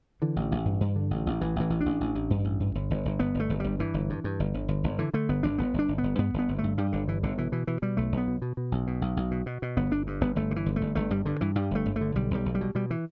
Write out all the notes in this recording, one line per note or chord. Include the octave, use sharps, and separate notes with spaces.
D3 E3
A1
A1
G2
G2
D3
A1
A1
A1 E3
A1 E3
A1
A1 D4
A1
A1
G2
A1
G2
G1
G1
G1
G1 B3
G1
A3
G1
G1 G3
G2 E3
G1
G2
G2
G1
G1
G1
G1
D3 E3
D3 A3
G1 B3
G1 D4
G1 B3
G1
D4
G1
B3
G1
G2 B3
G1 B3
G1
A3
G2
G2 G3
G1 D3
G2 E3
G1 D3
B2 E3
B2 E3
B2 E3
B2 G3
B1 A3
B1
B3
B2
B2
B2
B1
B2
B1
B1
B2
B2
B2
G1 B3
G1 D4
G2
G1 B3
G1 A3
D3
E3
G1
G1 A3
G1 A3
G2 G3
G2 D3
G2 E3
G2 G3
G1 A3
G1
A3
D3
B1 G3
B1 G3
B1
G3
B2
B2 G3
E3